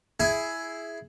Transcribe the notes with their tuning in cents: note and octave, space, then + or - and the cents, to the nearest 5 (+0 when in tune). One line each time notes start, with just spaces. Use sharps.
E4 +0 G#4 +10